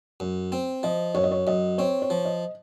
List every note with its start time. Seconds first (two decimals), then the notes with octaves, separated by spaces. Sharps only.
0.20 F#2
0.52 C4
0.83 F3 D#5
1.15 F#2 C#5
1.24 D#5
1.31 C#5
1.47 F#2 D#5
1.78 C4 C#5
2.02 C#5
2.10 F3
2.25 D#5